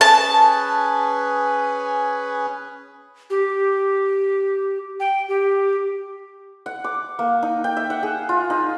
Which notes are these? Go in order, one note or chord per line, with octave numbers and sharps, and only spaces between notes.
C#4 G#4 B4 A5
G4
G5
G4
F#5
D6
A#3
D#4
G5
E5
F#5
G#4
F4
D#4